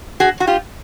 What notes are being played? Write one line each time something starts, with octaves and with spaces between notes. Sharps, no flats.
F#4 G#4
F#4
F4 G4